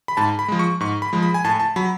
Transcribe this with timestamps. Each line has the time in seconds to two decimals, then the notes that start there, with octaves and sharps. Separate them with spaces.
0.08 B5
0.17 G#2 A5
0.39 B5
0.48 F3 G#3
0.59 C#6
0.80 G#2 C#6
1.02 B5
1.13 F3 G#3
1.23 B5
1.34 G#5
1.44 A2 A5
1.60 A5
1.76 F#3 B5